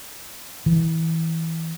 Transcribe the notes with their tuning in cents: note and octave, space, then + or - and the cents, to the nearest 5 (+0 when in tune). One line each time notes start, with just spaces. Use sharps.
E3 -20